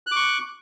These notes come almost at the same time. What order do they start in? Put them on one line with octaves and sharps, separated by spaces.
F#6 D6 C#6